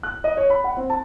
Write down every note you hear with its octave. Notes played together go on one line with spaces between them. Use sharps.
F#6
D#5
C#5
B5
F#5
C4
A5